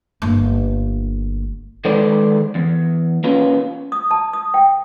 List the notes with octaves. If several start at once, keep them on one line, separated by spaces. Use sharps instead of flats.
G1 A#3
D#3 G#3 A4 B4 C5 D5
E2
A#3 C#4 F4 B4
D#6
A5
D#6
G5